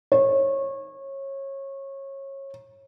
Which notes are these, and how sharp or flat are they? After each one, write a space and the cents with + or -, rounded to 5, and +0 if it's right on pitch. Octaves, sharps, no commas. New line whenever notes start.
C#5 -25